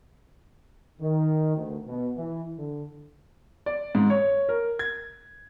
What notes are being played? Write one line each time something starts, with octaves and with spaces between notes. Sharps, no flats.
D#3
D2
B2
E3
D3
D5
G#2
C#5
A#4
G#6